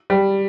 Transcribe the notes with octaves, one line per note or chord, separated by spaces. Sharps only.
G3